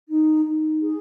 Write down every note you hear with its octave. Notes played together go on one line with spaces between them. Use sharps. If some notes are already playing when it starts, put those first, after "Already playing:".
D#4
D#4
G#4